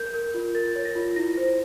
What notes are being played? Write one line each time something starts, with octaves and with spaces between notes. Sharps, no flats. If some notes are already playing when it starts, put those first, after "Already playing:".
Already playing: A#4 G6
A#4
F4
A#4 A6
C#5
A#6
F4
E4 A#6
C5